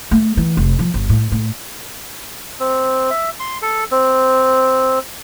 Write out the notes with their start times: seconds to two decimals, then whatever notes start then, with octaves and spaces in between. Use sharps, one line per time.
0.11 A3
0.37 E3
0.57 F1
0.79 F3
0.94 G1
1.09 A2
1.32 A2
2.60 C4
3.10 E5
3.40 C6
3.62 A4
3.91 C4